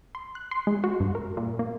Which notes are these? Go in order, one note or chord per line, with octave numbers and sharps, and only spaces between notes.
C6
F#6
C6
G#3
F#4
G2
A#4
A#2
A#3